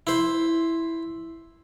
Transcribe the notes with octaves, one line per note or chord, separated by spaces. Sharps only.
E4 C5